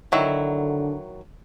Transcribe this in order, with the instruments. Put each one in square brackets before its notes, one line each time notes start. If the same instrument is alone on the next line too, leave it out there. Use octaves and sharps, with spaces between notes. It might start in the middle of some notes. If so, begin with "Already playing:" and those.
[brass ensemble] D3 [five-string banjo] D#3 F#3 E4